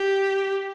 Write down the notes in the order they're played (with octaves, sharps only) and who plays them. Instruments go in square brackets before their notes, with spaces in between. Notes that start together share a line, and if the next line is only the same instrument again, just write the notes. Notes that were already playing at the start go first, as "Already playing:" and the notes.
Already playing: [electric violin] G4